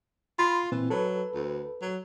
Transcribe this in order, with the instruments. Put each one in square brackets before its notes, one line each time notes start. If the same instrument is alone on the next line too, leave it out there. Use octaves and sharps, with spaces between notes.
[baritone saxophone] F4 [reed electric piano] B5 C6
[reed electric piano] A#2 C4 [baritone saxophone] E3
[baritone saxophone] F#3 [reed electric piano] A4 B4
[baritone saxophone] D2
F#3